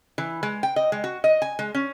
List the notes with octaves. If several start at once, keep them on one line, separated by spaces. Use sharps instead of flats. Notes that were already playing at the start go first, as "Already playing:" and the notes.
E3
G#3
G5
D#5
G#3
F#4
D#5
G#5
G#3
C#4